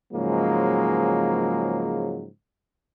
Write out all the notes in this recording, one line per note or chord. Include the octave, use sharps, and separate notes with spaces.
G#2 C#3 F3 F#3 G#3 A#3